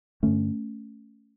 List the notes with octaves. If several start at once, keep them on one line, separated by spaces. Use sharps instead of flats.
G2 D3 A3 C#4